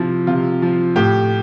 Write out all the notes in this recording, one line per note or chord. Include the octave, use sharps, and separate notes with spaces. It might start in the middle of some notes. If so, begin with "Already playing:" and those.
Already playing: C3 F3 E4
C3 F4
F3
A2 G4